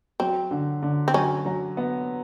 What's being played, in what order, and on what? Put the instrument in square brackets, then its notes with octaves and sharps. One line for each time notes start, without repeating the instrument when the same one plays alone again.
[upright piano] F#3 [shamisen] C4
[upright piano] D3
D3
[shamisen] C4
[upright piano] F#3 [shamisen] C#4
[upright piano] F#3
B3